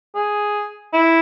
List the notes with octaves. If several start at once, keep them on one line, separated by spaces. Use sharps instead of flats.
G#4
E4